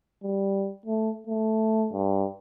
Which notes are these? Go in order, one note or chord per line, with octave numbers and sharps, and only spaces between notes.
G3
A3
A3
G2